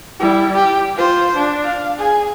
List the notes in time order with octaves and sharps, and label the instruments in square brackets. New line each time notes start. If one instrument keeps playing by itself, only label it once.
[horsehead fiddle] G3 E4
G4
F4 C5
D4
F5
G#4 G#5